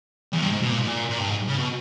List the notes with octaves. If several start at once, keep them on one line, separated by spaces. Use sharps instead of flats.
E2
G2
G#2
B2
A#2
G#2
A#2
A#2
G2
G#2
C#3
B2